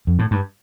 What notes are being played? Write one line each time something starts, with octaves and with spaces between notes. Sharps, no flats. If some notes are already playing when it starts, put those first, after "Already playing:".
F2
A2
G2